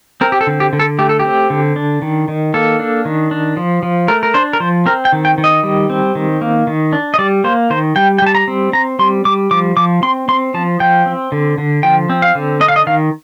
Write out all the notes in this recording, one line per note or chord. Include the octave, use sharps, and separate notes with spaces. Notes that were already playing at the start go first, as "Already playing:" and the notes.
C4 A#4
G4
A4
D3
G4
D3
A4
A3 G4
A4
G4
C4
D3
D4
D#3
D#3
A#3 A4
D4
D#3
D4
F3
F3
A3 A#4
A#4
D4 C5
A#4
F3 C5
C4 A#4
G5
D#3
G5
D#3
D#5
G3
C4
D#3
A#3
D#3
D4
D#5
G3 D5
A#3 C5
D#3 C5
G3 G5
G5
G3 A5
A#5
C4
C4 A#5
G3 C6
G3 D6
F3 D6
F3 D6
C4 C6
C4 C6
F3 A5
F3 G5
C4
D3
D3
F3 G5
C4
F5
D3
D4 D#5
F5
D#5
D#3 F5